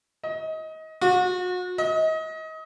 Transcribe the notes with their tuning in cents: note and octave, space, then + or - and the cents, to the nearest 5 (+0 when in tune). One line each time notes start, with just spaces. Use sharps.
D#5 +25
F#4 -35
D#5 +30